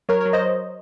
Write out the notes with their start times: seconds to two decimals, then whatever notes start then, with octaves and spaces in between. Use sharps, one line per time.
0.09 F#3 A#4 C#5
0.21 F#3 A#4 C#5
0.33 C5 D#5